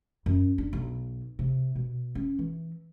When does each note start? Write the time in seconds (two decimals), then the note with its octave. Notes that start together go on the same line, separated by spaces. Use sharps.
0.26 F#2
0.58 D4
0.73 B1
1.39 C3
1.75 B2
2.15 C#4
2.39 E3